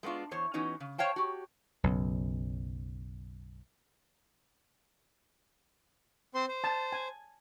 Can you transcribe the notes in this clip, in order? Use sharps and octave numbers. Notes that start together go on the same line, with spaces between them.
G#3 A3 B3 D4 F4
E2 C5 C#5
E3 B3 C#4 D#4 F#4
C#3
C5 C#5 F5 G5 A5
F#4 G4
B1 F#2 C#3
C4 C5 C6
C5
A5
G#5